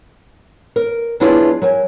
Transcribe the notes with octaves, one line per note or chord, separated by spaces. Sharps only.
A#4
F#3 B3 D4 E4 F4 G#4
F#3 A#4 G#5